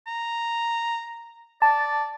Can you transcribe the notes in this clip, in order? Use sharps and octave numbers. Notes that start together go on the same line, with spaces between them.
A#5
D5 A5